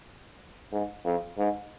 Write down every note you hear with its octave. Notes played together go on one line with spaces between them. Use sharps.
G#2
F2
G#2